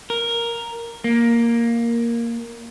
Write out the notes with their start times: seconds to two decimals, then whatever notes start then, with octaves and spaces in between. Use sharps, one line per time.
0.10 A#4
1.04 A#3